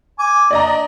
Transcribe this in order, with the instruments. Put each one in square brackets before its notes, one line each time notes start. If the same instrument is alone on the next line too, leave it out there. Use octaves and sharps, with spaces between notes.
[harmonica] G#5 D6
[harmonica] D4 [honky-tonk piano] D5 D#5 A#5